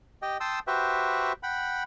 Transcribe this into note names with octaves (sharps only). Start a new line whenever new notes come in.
G4 D#5 G5
G5 A5 C6 D#6 E6
F#4 G4 B4 C5 E5 G5
F#5 G5 B5